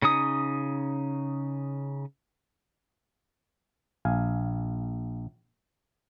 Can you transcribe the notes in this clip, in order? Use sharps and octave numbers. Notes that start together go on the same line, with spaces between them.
C#3 C#4 D#4 D#6
A#1 F5 G#5